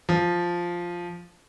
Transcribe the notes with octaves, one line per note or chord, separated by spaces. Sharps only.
F3